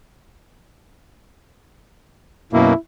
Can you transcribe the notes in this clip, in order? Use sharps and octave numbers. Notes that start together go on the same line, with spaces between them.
F#2 B2 A#3 E4